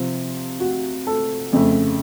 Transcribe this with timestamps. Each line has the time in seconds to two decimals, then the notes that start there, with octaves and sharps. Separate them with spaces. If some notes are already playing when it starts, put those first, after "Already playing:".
Already playing: C3 F3 C4
0.60 F#4
1.07 A4
1.53 F2 C#3 A3